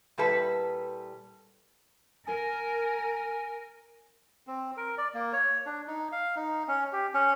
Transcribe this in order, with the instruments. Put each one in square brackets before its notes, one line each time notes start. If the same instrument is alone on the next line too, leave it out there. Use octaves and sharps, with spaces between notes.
[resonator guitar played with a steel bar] A#2 G3 E4 A4 B4
[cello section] A#4 [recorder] G#5
[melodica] C4
A#4
D5
A#3
C#5
D4
D#4
F5
D#4
C#4
G4
C#4